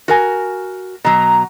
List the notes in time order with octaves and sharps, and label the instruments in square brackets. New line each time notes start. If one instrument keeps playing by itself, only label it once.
[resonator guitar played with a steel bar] F#4 A#4 G#5
[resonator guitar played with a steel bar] B2 F#3 [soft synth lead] A#5